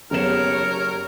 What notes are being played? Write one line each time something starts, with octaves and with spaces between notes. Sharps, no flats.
F#1 B3 G4 A#4 C#5 E7